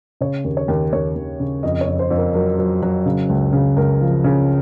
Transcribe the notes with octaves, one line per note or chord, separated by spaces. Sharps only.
C#3 C#5
D#2
C#5
D#2
D#2 C#5
D#2
C#3
F2 D#5
C#5
F2
C5
F2
A#4
F#3 A#4
F#3
F#3
C#3
C#2
C#3
C#2 A#4
F3
C#3